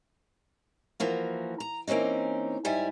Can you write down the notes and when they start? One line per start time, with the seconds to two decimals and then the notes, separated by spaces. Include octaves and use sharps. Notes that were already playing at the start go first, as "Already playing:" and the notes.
1.00 E3 F3 A#3 F#4
1.60 A#5
1.87 E3 A#3 C4 C#4 D#4
2.65 G#2 G3 E4 G#5